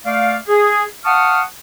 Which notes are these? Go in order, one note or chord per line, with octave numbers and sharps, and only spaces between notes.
A3 D5 F5
G#4
F5 F#5 A5 C#6 D#6 F6